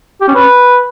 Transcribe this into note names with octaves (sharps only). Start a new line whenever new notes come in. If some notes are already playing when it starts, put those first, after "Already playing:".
G4
C#4
B4